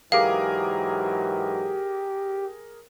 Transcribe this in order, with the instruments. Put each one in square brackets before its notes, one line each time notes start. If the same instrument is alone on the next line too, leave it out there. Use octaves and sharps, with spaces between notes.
[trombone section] G#2 E3 F#3 [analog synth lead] G4 [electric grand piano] G#4 A#4 D6 [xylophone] F5